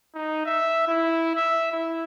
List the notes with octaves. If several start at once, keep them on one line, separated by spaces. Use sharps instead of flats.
D#4
E5
E4
E5
E4